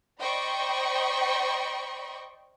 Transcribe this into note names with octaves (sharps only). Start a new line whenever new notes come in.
C5 D5 D#5 G5 B5 C#6